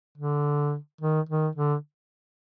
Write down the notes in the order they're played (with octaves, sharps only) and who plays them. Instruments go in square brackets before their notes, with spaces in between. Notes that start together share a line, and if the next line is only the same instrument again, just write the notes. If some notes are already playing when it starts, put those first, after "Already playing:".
[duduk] D3
D#3
D#3
D3